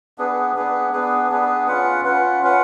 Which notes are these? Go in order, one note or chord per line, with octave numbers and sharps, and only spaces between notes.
B3 D4 G#4 B4
B3 D4 G#4 B4
B3 D4 G#4 B4
B3 D4 G#4 B4
C#4 F4 B4 F#5
C#4 F4 B4 F#5
C#4 F4 B4 F#5